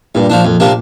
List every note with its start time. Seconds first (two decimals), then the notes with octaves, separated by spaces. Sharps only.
0.15 G2 A#2
0.30 A#2 F3 D4
0.45 F2
0.60 C3 A#3 D4